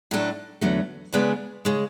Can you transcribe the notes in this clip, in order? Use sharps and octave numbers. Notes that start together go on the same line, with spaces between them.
A2 F#3 A3 D4
E2 D3 F#3 A3
E2 C#3 G#3 B3 D4
C#3 G#3